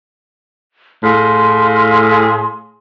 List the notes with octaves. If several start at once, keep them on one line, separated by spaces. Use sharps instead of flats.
A2 G#4 F5 C6